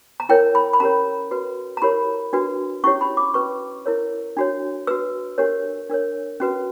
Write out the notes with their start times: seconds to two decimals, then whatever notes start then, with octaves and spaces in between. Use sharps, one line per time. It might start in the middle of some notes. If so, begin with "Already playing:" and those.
0.20 A#5
0.29 E4 A#4 C#5 G5
0.55 B5
0.73 B5
0.80 C#4 G4 A#4 C#5 A#5
1.31 F#4 B4
1.77 A#5
1.82 E4 G4 A#4 C#5 B5
2.33 D4 F#4 B4
2.84 C#4 E4 G4 C#5 C#6
3.01 B5
3.17 D6
3.34 C#4 F#4 B4 C#6
3.86 E4 A#4 C#5
4.37 D4 F#4 C#5
4.87 F#4 B4 E6
5.38 D4 G4 A#4 C#5
5.89 D4 A#4 C#5
6.40 C#4 F#4 B4